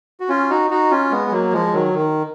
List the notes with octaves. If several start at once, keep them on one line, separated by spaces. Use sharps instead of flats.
F#4
C#4 F4
D#4 F#4
D#4 F#4
C#4 F4
G#3 B3
G#3
F#3 A#3
F3 G#3
D#3 F#3
D#3